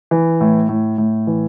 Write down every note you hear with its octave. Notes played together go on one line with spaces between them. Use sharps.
E3
A2
A2
A2
E3